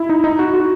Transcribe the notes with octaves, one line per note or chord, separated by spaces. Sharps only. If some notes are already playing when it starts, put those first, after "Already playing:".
Already playing: E4
D#4
D#4
F#4
F#4